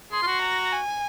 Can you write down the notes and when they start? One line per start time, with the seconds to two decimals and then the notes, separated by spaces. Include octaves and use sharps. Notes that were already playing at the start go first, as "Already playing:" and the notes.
0.12 G#4 C6
0.22 F4
0.27 F#4
0.42 A#5
0.72 G#5